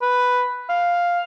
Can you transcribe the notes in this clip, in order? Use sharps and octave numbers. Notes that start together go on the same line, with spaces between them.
B4
F5